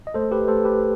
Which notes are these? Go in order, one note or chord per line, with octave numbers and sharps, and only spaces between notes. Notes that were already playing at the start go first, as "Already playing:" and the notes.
D#5
A3 A4 C5
G4 B4
A3 A4 C5
G4 B4